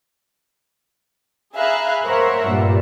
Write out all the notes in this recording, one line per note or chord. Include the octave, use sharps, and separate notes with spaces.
G#4 E5 F5 A#5 B5 F#6
A#4 C5 C#5 E5 F#5
G2 A#2 G3